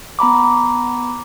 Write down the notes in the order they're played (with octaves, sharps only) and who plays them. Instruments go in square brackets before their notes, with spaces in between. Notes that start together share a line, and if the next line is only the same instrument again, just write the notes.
[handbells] B3 A#5 B5 D6